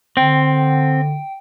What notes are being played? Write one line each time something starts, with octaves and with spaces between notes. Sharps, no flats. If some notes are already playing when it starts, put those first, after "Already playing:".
D3 C4 G5